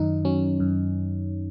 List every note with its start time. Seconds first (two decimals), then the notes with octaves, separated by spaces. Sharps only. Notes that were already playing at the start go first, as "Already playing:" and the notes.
Already playing: F#2 D#3 D#4
0.25 F#3 C#4
0.60 F#2